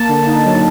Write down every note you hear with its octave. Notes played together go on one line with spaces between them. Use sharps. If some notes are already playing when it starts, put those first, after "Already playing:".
Already playing: A#3 A5
D3
D#4
F#3